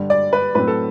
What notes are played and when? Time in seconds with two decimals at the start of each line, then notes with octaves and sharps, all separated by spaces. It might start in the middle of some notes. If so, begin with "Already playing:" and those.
Already playing: G2 D3 G3
0.10 D5
0.33 B4
0.55 A2 F#3 C4 B4
0.67 A4